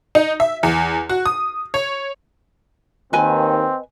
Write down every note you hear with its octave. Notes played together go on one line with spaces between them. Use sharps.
D#4
E5
E2
F#4
D#6
C#5
D#2 D#3 C4 B4 D#5 G#5